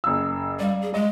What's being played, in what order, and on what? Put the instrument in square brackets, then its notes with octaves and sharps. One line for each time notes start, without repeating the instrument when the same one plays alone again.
[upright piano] F#1 E6
[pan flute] G3 [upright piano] D5 F5
[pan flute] G#4
[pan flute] G#3 [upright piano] D#5